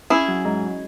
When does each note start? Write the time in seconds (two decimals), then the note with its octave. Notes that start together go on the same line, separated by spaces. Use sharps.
0.10 C#4 E4 G#4
0.28 F#3
0.45 G#2